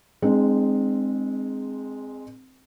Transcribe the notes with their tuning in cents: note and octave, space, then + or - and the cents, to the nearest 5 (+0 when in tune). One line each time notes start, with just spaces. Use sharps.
G#3 +0 C4 +0 D#4 -45